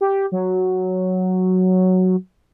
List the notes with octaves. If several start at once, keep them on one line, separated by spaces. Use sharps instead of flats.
G4
F#3